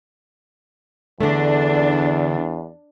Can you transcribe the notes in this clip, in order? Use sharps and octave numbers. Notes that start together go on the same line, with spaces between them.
E2 D3 A3 D4